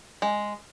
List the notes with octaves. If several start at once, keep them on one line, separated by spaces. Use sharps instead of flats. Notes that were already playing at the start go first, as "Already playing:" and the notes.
G#3